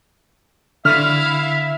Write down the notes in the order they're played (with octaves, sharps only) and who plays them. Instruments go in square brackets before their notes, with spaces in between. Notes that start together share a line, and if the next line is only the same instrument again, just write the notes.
[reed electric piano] D3 [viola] E4 F5 [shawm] E5 [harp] F6